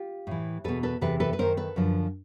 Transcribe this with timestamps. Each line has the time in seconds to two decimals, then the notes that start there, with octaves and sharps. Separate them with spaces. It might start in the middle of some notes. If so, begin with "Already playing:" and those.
Already playing: F4 G4
0.27 A2 E3
0.64 E2 B2 A4 B4
0.83 A4 B4
1.01 E2 C3 E3 A4 B4
1.20 A4 B4
1.33 B4
1.39 F#2 D#3 A#4 C5
1.57 A4 B4
1.76 F#2 D3 F3